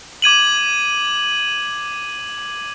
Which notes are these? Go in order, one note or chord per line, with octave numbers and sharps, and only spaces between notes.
D6 G#6 D#7 F#7